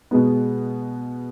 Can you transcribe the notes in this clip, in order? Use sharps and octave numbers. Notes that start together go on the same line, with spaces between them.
B2 G#3 B3